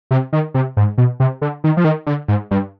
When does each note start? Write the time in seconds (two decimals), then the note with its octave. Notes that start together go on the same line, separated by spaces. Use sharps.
0.11 C3
0.33 D#3
0.54 C3
0.77 G#2
0.98 B2
1.20 C3
1.42 D3
1.64 D#3
1.77 F3
1.84 D#3
2.07 D3
2.28 G#2
2.51 G2